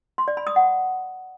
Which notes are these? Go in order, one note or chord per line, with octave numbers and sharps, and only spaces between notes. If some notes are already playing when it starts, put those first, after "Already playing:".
C6
D5
B5
D#6
F#5